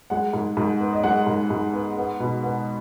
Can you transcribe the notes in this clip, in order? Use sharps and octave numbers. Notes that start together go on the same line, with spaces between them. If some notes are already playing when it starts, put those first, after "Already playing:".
G#3 F#5
G#2
G#2
B3
D#5
G#3 F#5
G#2
G#2
B3
B3
B2
B3